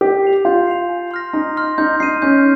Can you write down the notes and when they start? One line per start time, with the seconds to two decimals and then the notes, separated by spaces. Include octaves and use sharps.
0.01 G4 G6
0.24 C7 F7
0.45 F4 G6
0.67 C7 F7
0.89 G#5
1.11 C6 F6 A#6
1.33 D#4 G#5
1.57 C6 F6 A#6
1.78 D#4 G6
2.00 D#4 C7 D#7
2.22 C#4 G6